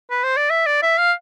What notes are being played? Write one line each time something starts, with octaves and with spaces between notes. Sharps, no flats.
B4
C5
D5
E5
D5
E5
F5